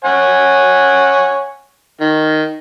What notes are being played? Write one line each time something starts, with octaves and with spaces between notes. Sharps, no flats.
C#5 F#5 G#5
D#3